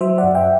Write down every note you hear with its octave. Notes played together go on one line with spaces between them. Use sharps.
F#3 C5 E5
D5 F#5
F#2
E5 G5